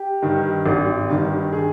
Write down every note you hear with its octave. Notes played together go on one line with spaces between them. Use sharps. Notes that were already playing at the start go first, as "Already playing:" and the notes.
Already playing: G4
G2 D#3
G#1
G2 D#3
G#4